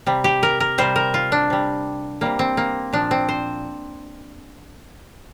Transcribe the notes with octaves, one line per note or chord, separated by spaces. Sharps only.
C3 G3
G4
A#4
A#4
C3 G3 C5
A#4
F4
D4
C3 G3
C3 G3 A#3
C4
A#3
A#2 F3 D4
C4
C5